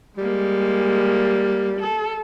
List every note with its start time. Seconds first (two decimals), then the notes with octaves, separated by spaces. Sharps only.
0.18 G3 G#3 A#3
1.80 A4